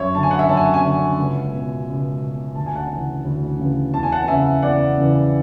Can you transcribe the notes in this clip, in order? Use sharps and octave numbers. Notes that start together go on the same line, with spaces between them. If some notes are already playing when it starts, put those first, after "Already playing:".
Already playing: F#2 C#5 E5
D3 A5
G#5
F#5
E5 G#5
F#2 A5
G#5
F#5
E5 G#5
D3
C#2
B2
C#2
B2
D2 A5
G#5
F#5 A5
C#3 E3
D2
C#3 E3
E2 A5
G#5
F#5 A5
C#3 E3 E5 G#5
E2 D5 F#5
C#3 E3